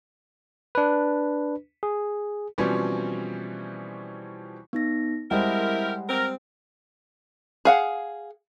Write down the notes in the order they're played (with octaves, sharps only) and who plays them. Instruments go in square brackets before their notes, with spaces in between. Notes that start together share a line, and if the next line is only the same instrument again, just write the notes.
[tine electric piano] D4 B4
G#4
[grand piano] B2 E3 F3 G3 C4 C#4
[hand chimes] B3 D#4 A#6
[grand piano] G3 G#3 C5 [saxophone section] C4 G4 A#4 [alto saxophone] E4 [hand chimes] F#5
[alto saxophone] C4 [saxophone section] A#4
[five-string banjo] G#4 F5 F#5